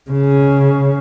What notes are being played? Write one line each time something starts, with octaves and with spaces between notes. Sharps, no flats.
C#3